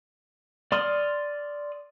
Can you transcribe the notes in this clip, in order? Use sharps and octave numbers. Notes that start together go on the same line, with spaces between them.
D5 C6 D#6 F6